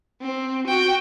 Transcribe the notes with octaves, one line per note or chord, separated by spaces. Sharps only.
C4
F#4 G5